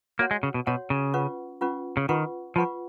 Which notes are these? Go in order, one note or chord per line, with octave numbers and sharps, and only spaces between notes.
A#3 F#4 C#5 F#5
G#3
C#3
B2
B2 F#4 C#5 F#5
C#3
C#4 F4 B4 F#5 C#6
C#4 F4 B4 F#5 C#6
C#3
D#3 F4 B4 F#5 C#6
F3 F4 B4 F#5 C#6